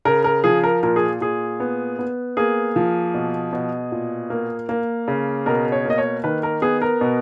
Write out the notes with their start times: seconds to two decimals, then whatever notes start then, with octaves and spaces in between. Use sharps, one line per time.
0.05 C#3 A#4
0.24 A#4
0.44 F3 G#4
0.64 A#4
0.83 A#2 A#4
0.96 G#4
1.21 A#2 G#4
1.60 B3
1.99 B3
2.37 A#3 G#4
2.76 F3
3.14 B2
3.53 B2
3.92 A#2
4.30 A#3
4.69 A#3
5.08 C#3
5.46 B2 A#4
5.72 C#5
5.85 A#3 D#5
5.98 C#5
6.24 D#3 B4
6.43 A#4
6.62 B3 G#4
6.82 A#4
7.01 B2